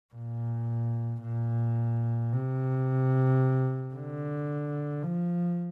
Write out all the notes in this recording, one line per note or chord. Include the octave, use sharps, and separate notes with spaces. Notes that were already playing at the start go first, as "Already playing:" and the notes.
A#2
A#2
C3
D3
F3